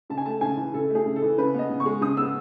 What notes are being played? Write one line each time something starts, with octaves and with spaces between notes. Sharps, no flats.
C#3 A5
G#5
A3 A5
C#3 G#5
E3
C#3 A4
A3
G#4
C#3
A4
E3
C#3 B4
B3 D#5
C#3
C#6
G#3
C#3 D#6
B3 E6